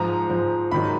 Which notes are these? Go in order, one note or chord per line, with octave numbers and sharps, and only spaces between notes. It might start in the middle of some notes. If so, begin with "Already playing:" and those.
Already playing: G#2 F3 A#5
G#2 F3
G#2 D#3 F#3 B5